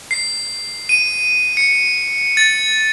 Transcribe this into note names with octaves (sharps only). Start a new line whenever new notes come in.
C7
D#7
C#7
A6